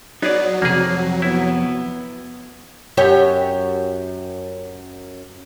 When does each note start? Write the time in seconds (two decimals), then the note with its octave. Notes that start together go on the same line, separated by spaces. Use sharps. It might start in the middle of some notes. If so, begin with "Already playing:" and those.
0.22 F#3 B3 D#4 G#4 D5
0.62 F2 A2 C3 A#3 G#4
1.22 B3 E4
2.97 F#2 G4 C#5